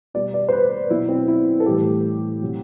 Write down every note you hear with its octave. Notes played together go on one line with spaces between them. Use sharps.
B2 G3 D5
D5
C5
B4
B4
B2 F#3 E4
C4
E4
A4
A2 E3 G3 G4
C3 F#3